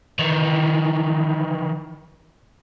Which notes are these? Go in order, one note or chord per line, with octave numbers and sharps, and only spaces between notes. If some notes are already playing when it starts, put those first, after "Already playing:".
D#3 E3